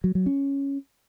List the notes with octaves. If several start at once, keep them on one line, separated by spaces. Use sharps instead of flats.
F#3
F#3
C#4